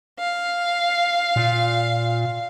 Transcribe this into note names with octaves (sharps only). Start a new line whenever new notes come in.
F5
A#2